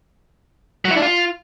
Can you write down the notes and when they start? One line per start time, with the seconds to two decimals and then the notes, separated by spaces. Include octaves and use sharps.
0.85 F#3
0.91 E4
0.97 D4
1.02 F4